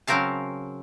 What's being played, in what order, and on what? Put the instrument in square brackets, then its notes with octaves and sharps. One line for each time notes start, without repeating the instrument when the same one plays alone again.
[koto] C#3 F#3 C4 A#4 F5 A5